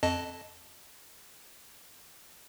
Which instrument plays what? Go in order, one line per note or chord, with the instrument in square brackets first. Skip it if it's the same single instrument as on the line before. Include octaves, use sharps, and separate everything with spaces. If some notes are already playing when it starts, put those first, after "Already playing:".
[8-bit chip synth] F2 D#5 A5